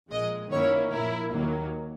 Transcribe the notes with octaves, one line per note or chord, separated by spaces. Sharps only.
A#1 A#2 G#3 D#5
F#2 D#3 A#3 C#4 E4 C#5
A#1 A#2 A#3 E4 A#4
D#2 D#3 F#3 A#3